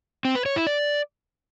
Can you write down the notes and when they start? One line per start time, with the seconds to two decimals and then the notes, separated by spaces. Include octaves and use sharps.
0.25 C4
0.35 B4
0.46 C#5
0.56 E4
0.67 D5